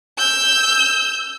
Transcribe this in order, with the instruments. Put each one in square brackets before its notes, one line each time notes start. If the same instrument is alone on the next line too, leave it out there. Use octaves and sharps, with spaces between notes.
[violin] E6 G6